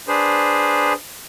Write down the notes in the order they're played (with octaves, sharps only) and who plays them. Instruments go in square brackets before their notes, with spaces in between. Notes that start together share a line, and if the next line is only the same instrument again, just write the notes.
[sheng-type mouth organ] D4 G#4 B4 C5